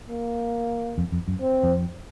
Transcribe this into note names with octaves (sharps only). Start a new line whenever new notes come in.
A#3
F2
F2
F#2
C4
F2